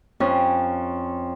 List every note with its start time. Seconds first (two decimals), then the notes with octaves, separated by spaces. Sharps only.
0.20 F2 C#4